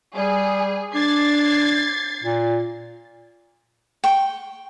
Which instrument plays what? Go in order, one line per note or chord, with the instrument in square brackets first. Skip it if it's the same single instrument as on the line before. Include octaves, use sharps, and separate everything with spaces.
[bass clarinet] G3 [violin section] G#4
[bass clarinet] D4 [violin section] G#6 A6 C7
[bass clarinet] A#2
[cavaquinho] G5 C#6